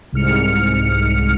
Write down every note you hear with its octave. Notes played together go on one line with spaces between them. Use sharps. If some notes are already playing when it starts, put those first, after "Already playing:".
C2 G#2 F6 C#7